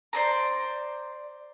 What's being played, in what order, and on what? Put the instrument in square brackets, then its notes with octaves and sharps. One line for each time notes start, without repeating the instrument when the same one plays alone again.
[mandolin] C5 D5 A#5